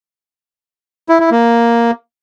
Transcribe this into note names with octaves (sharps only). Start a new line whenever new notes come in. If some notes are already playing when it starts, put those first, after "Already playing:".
E4
E4
A#3